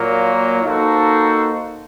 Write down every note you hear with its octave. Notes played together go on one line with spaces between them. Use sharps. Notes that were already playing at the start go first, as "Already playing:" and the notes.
Already playing: A#2 F#3 A#3
A#3 D#4 F#4 A4 C5